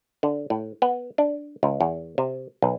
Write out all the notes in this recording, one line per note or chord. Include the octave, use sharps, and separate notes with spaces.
D3
A2
B3
D4
C#2
E2
C3
B1